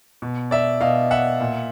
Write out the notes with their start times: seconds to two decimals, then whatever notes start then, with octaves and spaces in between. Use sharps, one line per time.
0.22 B2
0.51 D5 E5
0.81 B2 D#5 F5
1.11 E5 F#5
1.41 A#2